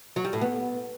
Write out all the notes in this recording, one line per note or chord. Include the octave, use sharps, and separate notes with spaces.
F#3
G3
A2
B3